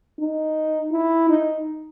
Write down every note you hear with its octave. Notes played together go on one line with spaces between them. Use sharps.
D#4
E4
D#4